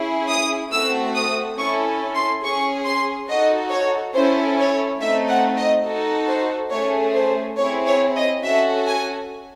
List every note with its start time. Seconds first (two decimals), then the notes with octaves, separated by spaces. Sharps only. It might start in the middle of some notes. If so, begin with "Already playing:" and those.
Already playing: C#4 E4 G#4
0.28 D#6
0.71 A3 C4 F#4 E6
1.15 D#6
1.58 C#4 E4 A4 C#6
2.15 C6
2.43 C#4 G#4 C#6
2.85 C6
3.29 D#4 F#4 A4 D#5
3.71 C#5
4.14 C#4 E4 A4 C5
4.58 C#5
5.00 A3 C4 D#4 E5
5.29 F#5
5.58 D#5
5.86 D#4 F#4 A4
6.28 C5
6.72 A3 C#4 G#4 C#5
7.14 C5
7.57 C4 E4 G#4 C#5
7.86 C#5
8.15 D#5
8.43 C#4 F#4 A4 E5
8.87 G#5